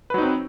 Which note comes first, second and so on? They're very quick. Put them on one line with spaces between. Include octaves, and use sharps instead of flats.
B4 F#3 D#4 C4